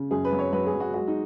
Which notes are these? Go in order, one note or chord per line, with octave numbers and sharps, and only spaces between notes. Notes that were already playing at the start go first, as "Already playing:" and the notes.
Already playing: C#3
F#2 G#4
B4
F#3
C#5
F#3 B4
G#4
F#3
F#4
G#3 F#4
D#4